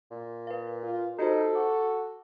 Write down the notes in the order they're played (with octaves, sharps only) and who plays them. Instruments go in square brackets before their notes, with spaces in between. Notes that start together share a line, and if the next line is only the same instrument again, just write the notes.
[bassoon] A#2
[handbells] B4 F5
[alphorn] F4
[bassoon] D#4 [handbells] F#4 G4 C5 [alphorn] A4
[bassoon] F#4 [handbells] D6